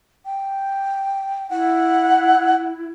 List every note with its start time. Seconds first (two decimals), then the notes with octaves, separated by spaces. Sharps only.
0.25 G5
1.50 E4 F#5